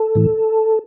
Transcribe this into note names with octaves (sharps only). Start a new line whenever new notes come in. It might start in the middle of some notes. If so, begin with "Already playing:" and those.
Already playing: A4
A2 E3